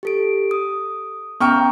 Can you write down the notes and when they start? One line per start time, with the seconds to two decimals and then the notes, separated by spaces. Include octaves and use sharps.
0.03 G4 A4 D7
0.51 D#6
1.41 B3 C#4 G5 A#5 C#6 F6